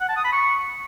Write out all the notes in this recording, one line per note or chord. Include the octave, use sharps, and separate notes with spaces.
F#5
A5
D#6
B5
C#6